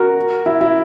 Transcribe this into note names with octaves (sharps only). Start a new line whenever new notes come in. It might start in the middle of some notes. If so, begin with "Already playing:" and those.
Already playing: F#4 A#4
E4
E4